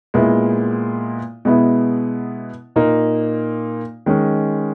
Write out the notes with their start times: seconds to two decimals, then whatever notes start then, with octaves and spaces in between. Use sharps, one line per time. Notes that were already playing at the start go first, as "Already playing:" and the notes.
0.14 A#2 G#3 B3 E4
1.45 B2 G#3 B3 E4
2.76 A#2 A#3 D#4
4.06 D#3 G#3 C#4